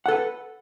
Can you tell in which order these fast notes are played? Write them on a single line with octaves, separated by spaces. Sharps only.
F#5 A4 B4